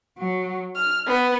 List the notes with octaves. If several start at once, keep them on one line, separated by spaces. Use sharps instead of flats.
F#3
F6
B3